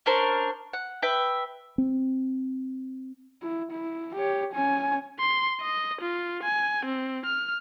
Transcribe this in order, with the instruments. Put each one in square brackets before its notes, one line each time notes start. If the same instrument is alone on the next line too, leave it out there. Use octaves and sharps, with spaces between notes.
[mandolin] C#4 D4 A#4 C5
F#5
B4 E5 G5
[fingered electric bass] C4
[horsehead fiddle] E4
E4
G4 C#5
C#4 G#5
[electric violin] C6
D#5
F4
G#5
C4
F6